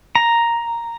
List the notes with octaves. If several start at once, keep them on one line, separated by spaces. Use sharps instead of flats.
A#5